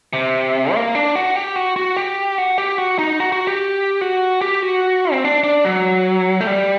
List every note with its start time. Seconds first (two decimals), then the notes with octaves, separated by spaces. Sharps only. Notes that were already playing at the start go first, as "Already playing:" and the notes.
0.13 C3
0.74 A#3
0.95 D4
1.15 F#4
1.36 G4
1.56 F#4
1.76 F#4
1.97 G4
2.38 F#4
2.58 G4
2.78 F#4
2.99 D#4
3.20 F#4
3.32 F#4
3.47 G4
4.01 F#4
4.41 G4
4.63 F#4
5.12 C4
5.24 D4
5.44 D4
5.65 F#3
6.40 A3
6.47 G3